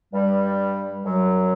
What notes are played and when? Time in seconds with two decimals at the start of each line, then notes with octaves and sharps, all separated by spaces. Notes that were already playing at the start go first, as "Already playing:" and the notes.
0.13 G2 G3
1.05 F#2 F#3